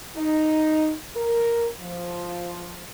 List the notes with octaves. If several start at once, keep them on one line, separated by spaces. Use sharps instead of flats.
D#4
A#4
F3